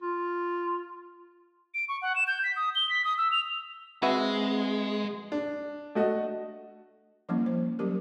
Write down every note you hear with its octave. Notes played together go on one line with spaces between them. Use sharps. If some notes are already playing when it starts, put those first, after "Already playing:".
F4
D7
C#6
F#5
E7
G6
B6
D#6
G7
B6
D#6
E6
F7
G#3 C4 F#4 B4 E5
D4
A3 F#4 D#5
F3 G3 A#3 C#4 E4
C5
F#3 G3 C#4 G4 A#4